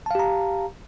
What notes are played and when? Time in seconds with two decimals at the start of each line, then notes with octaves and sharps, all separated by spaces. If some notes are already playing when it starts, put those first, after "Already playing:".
0.06 A5
0.11 F5
0.15 G4
0.19 A#5